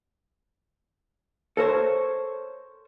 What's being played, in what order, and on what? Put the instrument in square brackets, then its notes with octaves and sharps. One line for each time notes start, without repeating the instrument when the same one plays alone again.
[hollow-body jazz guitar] A4 A#4 C5 C#5